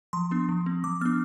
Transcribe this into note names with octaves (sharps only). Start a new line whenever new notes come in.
F3 C6
B3 D4
F3
C4
F3 D6
B3 D4 F6